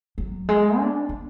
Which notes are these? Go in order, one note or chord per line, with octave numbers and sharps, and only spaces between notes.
F#3
G#3
D4
D4